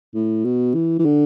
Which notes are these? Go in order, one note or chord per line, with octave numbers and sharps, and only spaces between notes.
A2
B2
E3
E3
D3